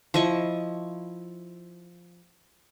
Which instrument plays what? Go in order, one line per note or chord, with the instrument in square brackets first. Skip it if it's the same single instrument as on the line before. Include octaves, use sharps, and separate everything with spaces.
[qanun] F3 E4 D#5 C#6